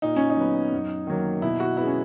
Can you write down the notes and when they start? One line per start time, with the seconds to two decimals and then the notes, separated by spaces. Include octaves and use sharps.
0.02 A#2 D#4
0.16 C#4
0.30 D#4
0.37 F#3 B3
0.72 F#2
1.07 D#3 F#3 A#3
1.42 B2 E4
1.60 F#4
1.77 G#3 B3 E4
1.87 C#4